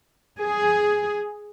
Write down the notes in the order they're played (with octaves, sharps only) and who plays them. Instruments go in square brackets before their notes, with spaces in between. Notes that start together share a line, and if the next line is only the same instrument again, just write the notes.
[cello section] G#4